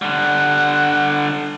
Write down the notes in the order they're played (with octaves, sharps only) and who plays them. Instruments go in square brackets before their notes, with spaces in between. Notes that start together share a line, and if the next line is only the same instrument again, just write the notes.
[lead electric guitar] D3 G3 [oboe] F#5